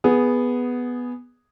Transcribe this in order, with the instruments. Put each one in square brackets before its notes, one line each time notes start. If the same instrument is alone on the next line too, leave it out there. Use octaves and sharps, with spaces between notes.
[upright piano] B3 G#4